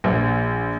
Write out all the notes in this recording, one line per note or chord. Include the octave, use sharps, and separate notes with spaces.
A#1